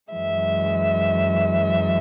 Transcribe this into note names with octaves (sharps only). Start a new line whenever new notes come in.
F#2 E3 G#3 E5